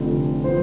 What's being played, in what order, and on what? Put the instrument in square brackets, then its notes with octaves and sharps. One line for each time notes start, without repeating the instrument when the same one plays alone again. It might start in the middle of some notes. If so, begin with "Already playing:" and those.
Already playing: [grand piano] F1 F2 D3 F3
F3 B3 C5